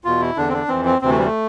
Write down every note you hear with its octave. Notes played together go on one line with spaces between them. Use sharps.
E2 B2 F4
E4
E2 D3 D4
C4
D4
F2 E3 C4
C4
D2 C3 E3 C4
A3
G3
A3